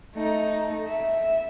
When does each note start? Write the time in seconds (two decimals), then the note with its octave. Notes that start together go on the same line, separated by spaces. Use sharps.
0.15 A3 D#4
0.87 E5